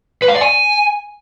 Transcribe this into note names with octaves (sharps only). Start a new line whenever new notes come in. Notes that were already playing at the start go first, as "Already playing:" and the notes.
B4
F5
D5
G#5